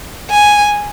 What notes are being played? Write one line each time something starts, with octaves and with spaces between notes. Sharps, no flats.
G#5